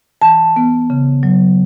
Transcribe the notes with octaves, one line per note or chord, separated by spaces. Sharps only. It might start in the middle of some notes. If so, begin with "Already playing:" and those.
E3 A5
B3
C#3
F#3